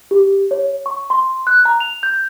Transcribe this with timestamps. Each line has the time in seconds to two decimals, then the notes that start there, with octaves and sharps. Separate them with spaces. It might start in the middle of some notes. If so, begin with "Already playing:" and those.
0.11 G4
0.51 C#5
0.86 C#6
1.10 C6
1.47 F#6
1.65 A#5
1.80 F7
2.03 G6